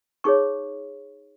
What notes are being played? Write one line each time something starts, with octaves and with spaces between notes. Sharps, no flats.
D#4 G#4 C#5 C#6